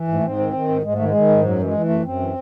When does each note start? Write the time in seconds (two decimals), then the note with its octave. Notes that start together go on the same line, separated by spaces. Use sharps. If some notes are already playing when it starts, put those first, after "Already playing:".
Already playing: E3
0.08 G#2
0.14 A3
0.23 G#2 C4
0.39 D#3
0.53 D#3
0.68 G#2
0.83 G#2 G#3
0.94 D#3 A3
1.05 G#3
1.14 D#3
1.29 G#2
1.43 F#2 F#3
1.59 E3
1.64 G#3
1.73 E3
1.84 A3
1.89 F#2
2.03 F#2 C4
2.20 E3